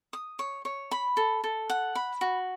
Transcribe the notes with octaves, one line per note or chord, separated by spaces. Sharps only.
D#6
C#5
C#5
B5
A4
A4
F#5
B5
F#4